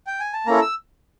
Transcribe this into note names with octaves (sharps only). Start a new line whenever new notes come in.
G5
G#5
A5
A#3 C#4 E4 A4 A#5
E6